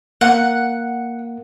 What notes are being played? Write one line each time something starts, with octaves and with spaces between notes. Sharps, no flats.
A#3 F#5